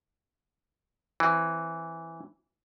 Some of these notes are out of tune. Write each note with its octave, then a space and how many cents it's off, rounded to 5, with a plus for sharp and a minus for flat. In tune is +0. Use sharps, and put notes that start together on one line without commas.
E3 +0 C4 +10